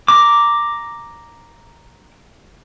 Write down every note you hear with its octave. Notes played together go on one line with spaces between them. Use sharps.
A#5 D6